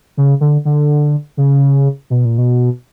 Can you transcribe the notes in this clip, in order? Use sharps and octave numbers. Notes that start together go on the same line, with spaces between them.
C#3
D3
D3
C#3
B2
A#2
B2